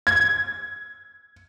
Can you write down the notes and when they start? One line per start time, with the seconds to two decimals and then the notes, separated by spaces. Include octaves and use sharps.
0.07 G#6